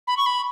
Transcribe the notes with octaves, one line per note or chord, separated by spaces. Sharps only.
B5
C#6
B5